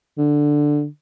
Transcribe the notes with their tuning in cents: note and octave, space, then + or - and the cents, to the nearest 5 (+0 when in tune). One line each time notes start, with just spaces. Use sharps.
D3 +5